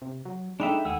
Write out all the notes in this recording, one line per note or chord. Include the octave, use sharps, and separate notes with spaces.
C3
F#3
G#3 D4 D#4 A4 E5 G5 B5
D#2 G#4 F#5 E6